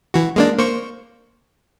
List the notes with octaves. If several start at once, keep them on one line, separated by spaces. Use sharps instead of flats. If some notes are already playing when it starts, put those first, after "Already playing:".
E3 F#4
G#3 A#3 D4
A#3 C5 C#6